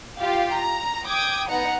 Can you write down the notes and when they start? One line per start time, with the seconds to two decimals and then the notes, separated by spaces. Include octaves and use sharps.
0.19 F4 G4 F5
0.54 A#5
1.07 G5 D6 D#6 G#6
1.48 B3 D#4 F#5 A#5